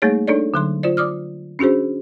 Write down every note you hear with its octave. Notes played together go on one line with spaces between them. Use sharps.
G3 A3 A#3 D#4 G#4 C#5
D4 D#4 A4 C#5 D5
D3 F#3 C6
F4 C5 D5
D5 D6 D#6 F6
C#4 D4 F#4 G#4 C5